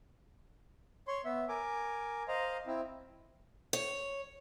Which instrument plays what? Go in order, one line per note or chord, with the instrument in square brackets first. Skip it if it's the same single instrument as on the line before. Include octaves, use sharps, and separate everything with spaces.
[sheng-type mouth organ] C#5 C6
B3 E5
A#4 G#5 D6
C5 D#5 F5 A#5
C4 E4
[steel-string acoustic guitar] C#5